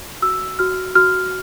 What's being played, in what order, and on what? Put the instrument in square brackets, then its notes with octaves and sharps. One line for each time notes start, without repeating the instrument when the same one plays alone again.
[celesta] F#4 E6
F#4 F6
F#4 F6